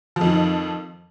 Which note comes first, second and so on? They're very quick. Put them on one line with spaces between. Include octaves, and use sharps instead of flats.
F3 F2 D#3